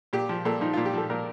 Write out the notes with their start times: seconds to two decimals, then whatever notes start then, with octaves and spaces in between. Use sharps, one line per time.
0.13 A#2 G4
0.29 F3
0.45 A#2 A4
0.61 F3 D#4
0.74 A#2 F4
0.85 G4
0.94 F3 A4
1.10 A#2 A#4